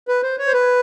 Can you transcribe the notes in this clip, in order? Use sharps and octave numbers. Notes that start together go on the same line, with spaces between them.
B4
C5
C#5
C5
B4